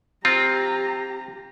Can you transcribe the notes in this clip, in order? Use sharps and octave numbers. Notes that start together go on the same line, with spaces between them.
C4 F4 G4 A#5